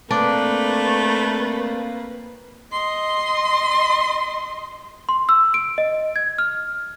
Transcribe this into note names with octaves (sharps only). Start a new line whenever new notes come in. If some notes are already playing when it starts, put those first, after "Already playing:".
A3 A#3 C4 D4 B4
D#5 C6
C6
E6
D7
D#5
G#6
F6